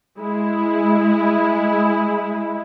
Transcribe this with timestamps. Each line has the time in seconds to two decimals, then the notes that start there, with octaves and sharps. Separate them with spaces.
0.19 G#3 E4